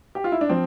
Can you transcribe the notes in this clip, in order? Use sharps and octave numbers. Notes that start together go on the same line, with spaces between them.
G4
F4
E4
D4
F3 C4